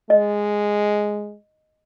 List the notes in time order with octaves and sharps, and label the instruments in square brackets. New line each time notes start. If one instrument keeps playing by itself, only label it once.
[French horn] G#3 [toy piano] D#5